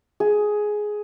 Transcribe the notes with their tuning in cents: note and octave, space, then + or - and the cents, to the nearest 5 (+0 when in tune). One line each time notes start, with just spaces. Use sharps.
G#4 +10